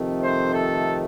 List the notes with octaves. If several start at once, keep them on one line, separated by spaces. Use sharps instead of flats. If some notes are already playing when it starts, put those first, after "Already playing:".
Already playing: F2 C3 D#3 A3
C5
A4